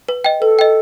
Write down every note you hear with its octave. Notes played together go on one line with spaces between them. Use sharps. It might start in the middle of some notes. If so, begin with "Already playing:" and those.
B4
D#5 G5
A4 B4
D#5 G5